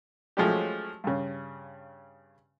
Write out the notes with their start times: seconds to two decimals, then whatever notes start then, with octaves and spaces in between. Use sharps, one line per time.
0.37 F3 F#3 G#3 A3 C#4 G4
1.04 G2 C#3